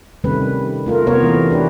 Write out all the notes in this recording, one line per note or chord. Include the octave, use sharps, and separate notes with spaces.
C3 D#3 G3 A3 C#4 B4
A3 F4 A#4
C3 B3 F4 A#4 C#5
E3 A3
D4 G4 B4